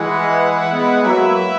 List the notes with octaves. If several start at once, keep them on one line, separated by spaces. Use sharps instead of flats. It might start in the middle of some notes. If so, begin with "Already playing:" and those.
Already playing: E3 G#3 E4 B4 F#5
G#3 B3
F#3 A#3 E4 B4 E5